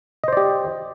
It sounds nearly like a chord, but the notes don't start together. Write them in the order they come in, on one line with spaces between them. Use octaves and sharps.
D#5 C5 D5 G4